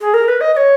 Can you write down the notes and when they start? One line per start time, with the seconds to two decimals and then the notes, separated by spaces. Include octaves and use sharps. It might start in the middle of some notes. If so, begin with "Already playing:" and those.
0.01 G#4
0.14 A#4
0.28 B4
0.41 D#5
0.53 D#5
0.57 C#5